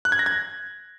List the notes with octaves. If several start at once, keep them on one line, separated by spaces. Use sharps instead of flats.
F#6
G#6
A#6
G#6